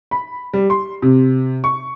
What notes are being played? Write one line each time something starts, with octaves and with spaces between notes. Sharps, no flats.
B5
G3
C6
C3
C#6